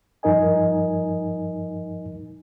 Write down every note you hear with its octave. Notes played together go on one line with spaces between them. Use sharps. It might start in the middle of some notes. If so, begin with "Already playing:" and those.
G2 F3 D#4 A#4 D#5 G#5